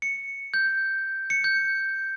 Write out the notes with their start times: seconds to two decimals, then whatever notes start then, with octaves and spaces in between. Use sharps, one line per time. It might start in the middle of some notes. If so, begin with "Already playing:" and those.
0.02 C#7
0.54 G6
1.30 C#7
1.44 G6